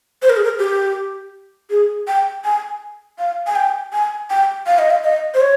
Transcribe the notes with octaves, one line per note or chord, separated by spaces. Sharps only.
C5
A#4
G#4
A#4
G4
G#4
G5
G#5
F5
G#5
G5
G#5
G5
F5
D#5
F5
D#5
C5
C#5